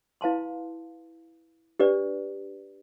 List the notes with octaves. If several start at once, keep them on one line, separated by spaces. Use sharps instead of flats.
E4 B4 F5 A5 C6
D4 G4 B4 D5